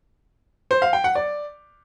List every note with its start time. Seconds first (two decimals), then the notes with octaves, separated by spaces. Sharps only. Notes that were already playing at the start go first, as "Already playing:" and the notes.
0.71 C5
0.82 F5
0.93 G5
1.04 F#5
1.15 D5